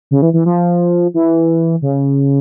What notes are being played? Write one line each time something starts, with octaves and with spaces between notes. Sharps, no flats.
C#3
E3
E3
F3
E3
C#3